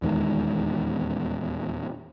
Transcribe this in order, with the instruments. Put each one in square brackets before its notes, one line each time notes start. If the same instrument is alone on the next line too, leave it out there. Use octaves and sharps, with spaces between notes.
[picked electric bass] D#1 E2 D#3 G#3